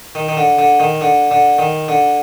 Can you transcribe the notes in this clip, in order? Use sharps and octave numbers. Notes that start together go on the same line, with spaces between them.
D#3
D#3
D3
D3
D#3
D3
D3
D#3
D3